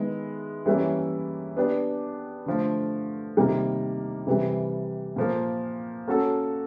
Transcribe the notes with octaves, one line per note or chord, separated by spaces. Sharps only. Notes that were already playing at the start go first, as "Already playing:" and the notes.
Already playing: D#3 G#3 B3 E4
E3 G3 A#3 C#4 E4
B3 D4 G4
D3 F3 A3
C3 D#3 G3 A#3
C3 E3 G3
A#2 F3 A#3
A#3 C#4 F#4 A4